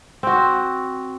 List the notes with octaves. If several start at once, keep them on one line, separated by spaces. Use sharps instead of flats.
C4 F#4